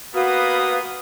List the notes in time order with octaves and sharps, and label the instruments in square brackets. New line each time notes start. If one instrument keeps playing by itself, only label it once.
[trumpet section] A#3 B3 D#6 [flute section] F#4 B4 F5